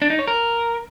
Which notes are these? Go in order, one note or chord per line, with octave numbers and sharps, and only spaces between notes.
D4
D#4
C#5
A#4